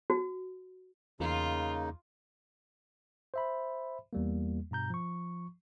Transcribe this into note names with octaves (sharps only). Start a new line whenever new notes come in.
F#4
E2 C#3 A#3 D#4 F4
C5 E5 B5
E2 G3 A#3
G2 B2 A#5 G6
F3 C#6